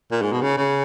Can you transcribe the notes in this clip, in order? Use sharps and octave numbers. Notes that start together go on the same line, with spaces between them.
A#2
G#2
B2
C#3
C#3